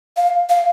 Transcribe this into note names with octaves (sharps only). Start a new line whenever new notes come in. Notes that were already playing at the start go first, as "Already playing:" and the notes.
F5
F5